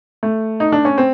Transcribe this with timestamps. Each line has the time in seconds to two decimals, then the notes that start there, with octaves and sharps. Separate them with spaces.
0.23 A3
0.60 D#4
0.72 D4
0.85 C#4
0.98 C4